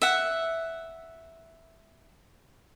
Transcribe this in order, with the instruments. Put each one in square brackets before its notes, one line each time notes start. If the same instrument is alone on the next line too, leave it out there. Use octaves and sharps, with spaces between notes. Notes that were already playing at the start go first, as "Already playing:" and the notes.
[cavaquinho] E5 F#5